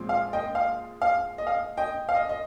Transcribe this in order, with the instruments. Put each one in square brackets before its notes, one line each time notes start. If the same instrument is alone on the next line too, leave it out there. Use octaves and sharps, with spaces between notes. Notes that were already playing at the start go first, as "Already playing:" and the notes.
Already playing: [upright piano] A#2 F3 G#3 C4
F5
D#5 G5
F5
F5
D#5
F5
D#5 G5
F5
D#5
D#5